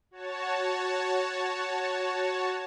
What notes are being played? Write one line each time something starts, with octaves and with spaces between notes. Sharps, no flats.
F#4 C#5 A5